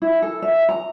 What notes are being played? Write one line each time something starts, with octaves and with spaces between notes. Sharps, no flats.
E4
A4
E5
A#5